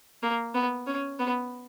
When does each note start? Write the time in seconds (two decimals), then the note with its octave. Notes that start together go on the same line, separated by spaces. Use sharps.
0.23 A#3
0.55 B3
0.87 C#4
1.19 B3